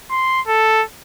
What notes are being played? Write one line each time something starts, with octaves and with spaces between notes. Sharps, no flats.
C6
A4